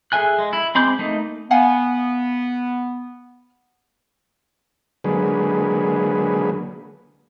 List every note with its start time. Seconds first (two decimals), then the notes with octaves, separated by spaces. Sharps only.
0.12 G#4 A4 E5 G#5 F#6
0.39 G#3
0.53 E4
0.75 G#3 C4 B5 D6 G6
0.99 A3 A#3 D#4
1.51 B3 F5 F#5 G#5
5.04 D3 F#3 G#3 A#3 G#4 B4